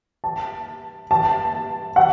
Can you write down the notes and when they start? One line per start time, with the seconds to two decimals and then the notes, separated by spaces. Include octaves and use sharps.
0.24 A5
1.11 A5
1.96 F#5